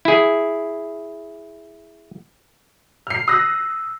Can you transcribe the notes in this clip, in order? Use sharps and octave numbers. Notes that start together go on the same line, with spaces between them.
E4 G#4
F6 C7
D#6 E6 F#6 A#6